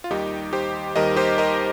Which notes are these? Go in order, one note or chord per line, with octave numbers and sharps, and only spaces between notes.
F4
D#2 D#3 G3 D#4 G4
G4 C5
D#2 D#3 G3 A#4 D#5
G4 C5
A#4 D#5